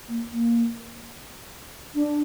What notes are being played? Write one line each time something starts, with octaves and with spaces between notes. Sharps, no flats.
A#3
A#3
D4